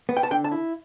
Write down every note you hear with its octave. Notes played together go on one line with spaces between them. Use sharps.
B3
G5
A5
D3 G5
A5
E4